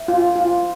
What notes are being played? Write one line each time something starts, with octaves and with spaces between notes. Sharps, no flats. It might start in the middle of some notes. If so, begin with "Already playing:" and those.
Already playing: E5
F4
F4